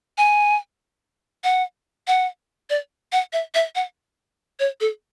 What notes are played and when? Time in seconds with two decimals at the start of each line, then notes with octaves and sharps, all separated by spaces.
0.18 G#5
1.44 F#5
2.07 F#5
2.70 D5
3.12 F#5
3.33 E5
3.55 E5
3.75 F#5
4.60 C#5
4.81 A4